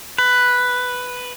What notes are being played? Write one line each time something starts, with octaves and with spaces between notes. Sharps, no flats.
B4